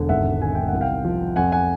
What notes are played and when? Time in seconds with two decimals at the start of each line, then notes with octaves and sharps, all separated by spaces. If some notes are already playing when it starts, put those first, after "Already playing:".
Already playing: E1 D3
0.09 G#1 E5 F#5
0.41 D#3 G#5
0.55 G5
0.68 C2 F#5
0.81 F5 G5
1.05 F3
1.36 F2 F#5 G#5
1.52 F#5 G#5